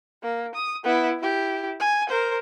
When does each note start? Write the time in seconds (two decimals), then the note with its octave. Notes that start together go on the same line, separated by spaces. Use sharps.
0.23 A#3
0.55 D#6
0.84 B3 E4
1.19 E4 G4
1.80 G#5
2.09 A#4 C5